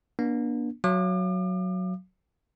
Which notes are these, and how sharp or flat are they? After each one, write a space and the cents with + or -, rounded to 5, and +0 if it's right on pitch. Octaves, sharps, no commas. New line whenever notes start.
A#3 +45 D4 +0
F#3 -5 F5 -40 D6 +40